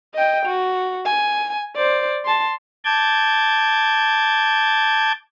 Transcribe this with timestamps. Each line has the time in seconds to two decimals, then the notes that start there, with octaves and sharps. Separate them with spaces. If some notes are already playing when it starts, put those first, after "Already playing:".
0.15 D#5 G5
0.46 F#4
1.05 G#5
1.76 C5 D5
2.25 A5 C6
2.85 A5 D6 G6 G#6